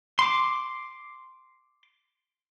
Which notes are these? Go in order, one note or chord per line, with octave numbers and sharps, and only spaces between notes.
C6 D6